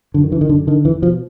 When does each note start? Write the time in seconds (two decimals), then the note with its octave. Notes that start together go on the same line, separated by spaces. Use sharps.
0.14 F#2 D3
0.24 D#3
0.32 D3 E3
0.41 D#3
0.49 F#2 D3
0.67 D3 D#3
0.85 E2 E3
1.02 B2 F3